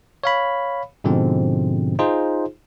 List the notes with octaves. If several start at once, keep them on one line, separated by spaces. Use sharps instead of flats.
C#5 F5 B5
G#2 B2 D3 F3 G#3 C4
D#4 F4 G#4 C5